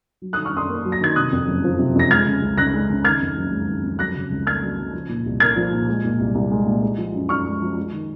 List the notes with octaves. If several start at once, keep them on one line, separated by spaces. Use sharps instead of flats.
F#3
D#6 F#6
D#3
C#6 F6
F#2 C6 D#6
A#3
F#3
A#6
D#3 G#6
C3 D#6 F#6
F2
F#1
F3
C3
F2 A#6
G#3 F6 G#6
C#3
C#2
C#2 F#6 A#6
G#3
C#3
D#3 F6 G#6
F2
F#1
G#3
D#3
F2
F#3 F#6 A#6
C#3
C#2
A#3 F6 G#6
F#3
C#3
F3
A#2
C2
A#3 F6 G#6
F3
A#2
G#3
A#2
C2
C2
G#3
A#2
G#3
F3
F#2
F#2 C#6 F6
G#3
F3
G#3
D#3